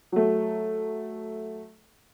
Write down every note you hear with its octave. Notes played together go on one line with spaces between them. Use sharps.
F#3 A3